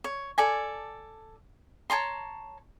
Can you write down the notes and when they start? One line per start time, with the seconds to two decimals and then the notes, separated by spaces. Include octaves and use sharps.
0.04 C#5
0.38 A4 D5 G#5
1.90 C#5 A5 A#5 C6